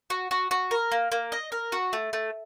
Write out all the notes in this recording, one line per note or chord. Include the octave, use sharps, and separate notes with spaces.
F#4
F#4
F#4
A#4
A#3
A#3
D#5
A#4
F#4
A3
A3